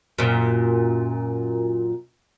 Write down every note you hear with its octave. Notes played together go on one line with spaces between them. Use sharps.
F#2 A#2